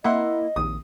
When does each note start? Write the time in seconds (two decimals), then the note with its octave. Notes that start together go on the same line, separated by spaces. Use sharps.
0.04 A#3 E4 D#5 E5 F#5 C6
0.56 A#1 D#2 D#6